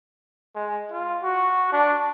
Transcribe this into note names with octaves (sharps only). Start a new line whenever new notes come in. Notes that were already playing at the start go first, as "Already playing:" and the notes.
G#3
F4
F#4
D4